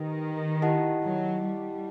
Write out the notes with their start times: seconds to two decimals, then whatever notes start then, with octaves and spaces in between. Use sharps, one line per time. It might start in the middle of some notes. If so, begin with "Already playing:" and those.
Already playing: D#3 D#4 G4 B4
0.62 E4 G4 D#5 F#5 A5
1.04 F#3
1.45 G3